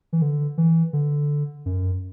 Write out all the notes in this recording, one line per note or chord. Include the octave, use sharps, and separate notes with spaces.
E3
D3
E3
D3
F#2